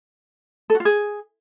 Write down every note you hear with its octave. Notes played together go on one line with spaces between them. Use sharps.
A4
F#4
F4
G#4